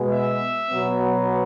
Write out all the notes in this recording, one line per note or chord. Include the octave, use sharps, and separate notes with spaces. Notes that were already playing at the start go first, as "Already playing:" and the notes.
Already playing: B2 G#3 B3
E5
B2 F#3 B3